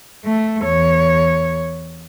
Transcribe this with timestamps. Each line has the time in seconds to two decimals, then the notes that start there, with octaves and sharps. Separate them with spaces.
0.25 A3
0.62 E2 C#5